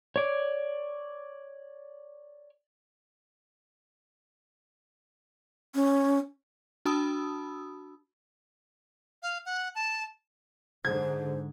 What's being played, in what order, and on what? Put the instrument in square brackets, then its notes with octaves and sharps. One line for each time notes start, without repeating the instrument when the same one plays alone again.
[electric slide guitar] C#5 D5
[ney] C#4
[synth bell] D4 F#4 A5 B5 D#6 E6
[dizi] F5
F#5
A5
[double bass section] G#2 D3 [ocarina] C5 [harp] G#6